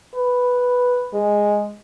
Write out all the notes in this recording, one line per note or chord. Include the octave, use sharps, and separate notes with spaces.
B4
G#3